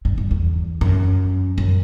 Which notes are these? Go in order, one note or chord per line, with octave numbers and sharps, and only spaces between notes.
G2
G2
E2
F#2
F#2